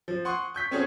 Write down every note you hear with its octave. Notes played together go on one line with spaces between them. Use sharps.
F3
F#5 C6 C#6 D#6
C#6 G6 B6
C4 C#4 F#4 G#4 A4 C#5